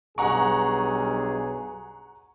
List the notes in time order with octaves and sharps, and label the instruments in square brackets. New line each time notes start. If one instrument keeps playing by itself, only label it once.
[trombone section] B1 G2 G#4 [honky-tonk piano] F#5 A#5 C#6